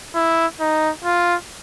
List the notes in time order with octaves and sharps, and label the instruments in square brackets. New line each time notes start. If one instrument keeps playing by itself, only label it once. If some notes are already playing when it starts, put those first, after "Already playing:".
[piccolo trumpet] E4
D#4
F4